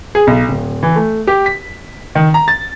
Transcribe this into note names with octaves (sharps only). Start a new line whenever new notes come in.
G#4
B1
D1
E3
A3
G4
B6
D#3
A#5
A6